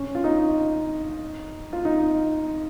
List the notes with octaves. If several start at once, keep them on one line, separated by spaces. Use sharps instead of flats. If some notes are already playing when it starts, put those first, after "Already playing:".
Already playing: C#4
F4
D#4
F4
D#4